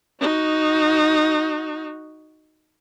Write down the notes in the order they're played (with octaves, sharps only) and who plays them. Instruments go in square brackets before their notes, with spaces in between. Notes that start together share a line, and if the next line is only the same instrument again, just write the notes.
[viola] D#4 F#4